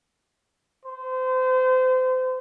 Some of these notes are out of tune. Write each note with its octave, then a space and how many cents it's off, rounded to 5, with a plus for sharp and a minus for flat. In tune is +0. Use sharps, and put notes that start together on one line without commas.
C5 -30